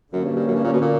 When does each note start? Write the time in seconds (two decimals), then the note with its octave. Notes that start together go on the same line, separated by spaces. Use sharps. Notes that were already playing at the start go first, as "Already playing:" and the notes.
0.13 F#2 D3 A#3 C#4
0.25 G2
0.36 G2
0.48 F#2
0.55 G2
0.64 A#2
0.73 B2
0.81 A#2